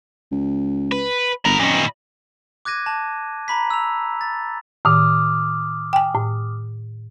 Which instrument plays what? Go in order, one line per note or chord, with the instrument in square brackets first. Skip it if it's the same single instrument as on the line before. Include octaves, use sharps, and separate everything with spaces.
[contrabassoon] C#2
[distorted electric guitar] B4
[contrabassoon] G1 [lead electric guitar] A#4 [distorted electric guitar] D#5 B5
[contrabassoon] F#2 [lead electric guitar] A#2 D#3
[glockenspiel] D6 F#6 G#6 A#6 D#7
A5
A#5 B5 B6
E6 F7
A6
[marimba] A2 D#3 [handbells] D6 D#6 F6
[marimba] G5 G#5
A2